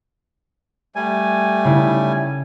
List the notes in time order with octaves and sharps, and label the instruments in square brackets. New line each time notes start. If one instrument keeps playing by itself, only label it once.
[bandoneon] G3 A3 G#5
[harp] C#3 E4